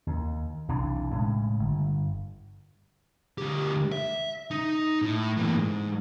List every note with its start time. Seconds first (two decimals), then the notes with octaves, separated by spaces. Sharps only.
0.07 D#2
0.68 B1 C3 E3 D4
1.11 A2 C#3 G#3
1.59 G1
3.38 D2 G4
3.92 E5
4.51 D#4
5.02 A2
5.37 E3 A#3
5.56 G#2